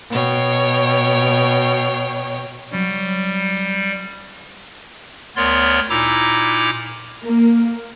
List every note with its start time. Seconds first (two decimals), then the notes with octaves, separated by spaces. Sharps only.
0.12 B2 C#5 G5
2.72 F#3 G3 C#4
5.36 D2 B3 A#4 C#5 D5 C6
5.90 A#2 D#4 E4 A#5 D6 E6
7.24 A#3